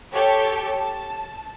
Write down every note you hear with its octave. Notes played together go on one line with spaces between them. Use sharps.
G4 A4 C#5
A5